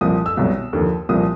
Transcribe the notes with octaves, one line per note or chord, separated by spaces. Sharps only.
C2 A#2 F3 D#6
E6
C2 B2 F#3
D#2 D3 F3
C2 A#2 F3 D#6